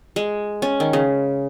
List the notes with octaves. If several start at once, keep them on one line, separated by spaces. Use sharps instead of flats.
G#3
C#4
D#3
C#3